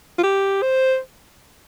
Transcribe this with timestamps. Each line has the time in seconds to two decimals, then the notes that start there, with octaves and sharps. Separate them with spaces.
0.18 F4
0.23 G4
0.62 C5